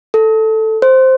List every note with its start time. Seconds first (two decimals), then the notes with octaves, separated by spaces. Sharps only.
0.14 A4
0.82 C5